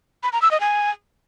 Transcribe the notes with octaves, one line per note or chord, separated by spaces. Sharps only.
B5
A#5
E6
D#5
G#5